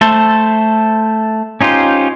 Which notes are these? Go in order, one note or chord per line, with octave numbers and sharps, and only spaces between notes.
A3 A4 C5
C#4 D#4 F4 G4 C5